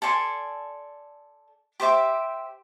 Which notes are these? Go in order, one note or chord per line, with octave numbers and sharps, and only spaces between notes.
A4 D5 G#5 C6
G4 C5 E5 D6